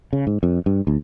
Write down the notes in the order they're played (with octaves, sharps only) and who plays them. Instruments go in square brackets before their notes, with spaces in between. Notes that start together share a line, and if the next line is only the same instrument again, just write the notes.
[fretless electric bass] C#3
G#2
F2
G2
D2